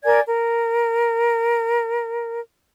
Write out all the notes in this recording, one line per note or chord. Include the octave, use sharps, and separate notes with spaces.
A#4 D5 G#5 G#6
A#4